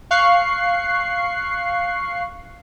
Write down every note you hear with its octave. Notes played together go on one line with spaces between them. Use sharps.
F5 C#6 F#6 C7